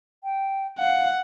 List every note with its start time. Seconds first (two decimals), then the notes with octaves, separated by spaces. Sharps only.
0.24 G5
0.79 F5 F#5